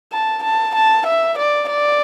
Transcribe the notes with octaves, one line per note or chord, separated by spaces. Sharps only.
A5
A5
A5
E5
D5
D5